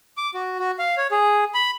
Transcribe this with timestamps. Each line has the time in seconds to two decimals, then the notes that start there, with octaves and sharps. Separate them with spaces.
0.17 D6
0.34 F#4
0.59 F#4
0.79 F5
0.97 C#5
1.11 G#4
1.54 B5